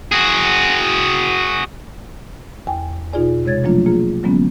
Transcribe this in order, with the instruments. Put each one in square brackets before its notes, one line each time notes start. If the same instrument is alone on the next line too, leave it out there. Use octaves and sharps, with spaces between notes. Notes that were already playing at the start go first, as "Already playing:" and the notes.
[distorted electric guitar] F#4 G#4
[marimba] E2 G5 G#5
B2 D#4 F4 G#4 D5 G#5
C3 G#3 C#5 G#6 A6
F3 F#3 A3 A#3 D4 F4
A#3 F4 G#4
D3 F#3 G#3 A#3 B3 C#4